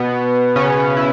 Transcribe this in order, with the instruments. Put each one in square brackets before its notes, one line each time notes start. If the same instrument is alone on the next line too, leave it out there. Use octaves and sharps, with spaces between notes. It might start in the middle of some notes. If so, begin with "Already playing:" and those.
Already playing: [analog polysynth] B2 B3
C#3 C#4
E4